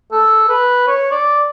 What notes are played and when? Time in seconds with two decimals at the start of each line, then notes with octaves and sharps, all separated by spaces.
0.12 A4
0.49 B4
0.87 C#5
1.12 D5